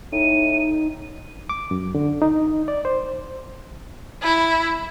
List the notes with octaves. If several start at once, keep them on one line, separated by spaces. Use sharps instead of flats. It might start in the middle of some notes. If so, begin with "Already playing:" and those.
A2 D#4 D#7
D6
F#2
D3
D#4
D5
C5
E4